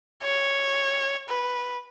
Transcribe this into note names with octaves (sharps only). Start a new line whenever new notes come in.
C#5
B4